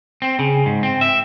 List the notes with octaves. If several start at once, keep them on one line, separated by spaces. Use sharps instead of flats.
C4
C#3
G#2
C4
E5